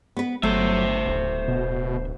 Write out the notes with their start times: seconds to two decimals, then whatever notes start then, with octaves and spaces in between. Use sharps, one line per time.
0.17 B3 B4
0.43 G1 F#3 A3 C5 E5
1.06 D1
1.48 B2